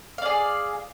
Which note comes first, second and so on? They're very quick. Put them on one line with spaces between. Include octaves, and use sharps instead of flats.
F5 D5 G#4